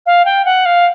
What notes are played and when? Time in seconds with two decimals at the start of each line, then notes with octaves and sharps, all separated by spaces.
0.06 F5
0.25 G5
0.45 F#5
0.66 F5